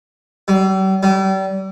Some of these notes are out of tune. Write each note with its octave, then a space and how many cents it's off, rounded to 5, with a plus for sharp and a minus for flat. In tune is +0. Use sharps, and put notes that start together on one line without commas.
G3 -45
G3 -35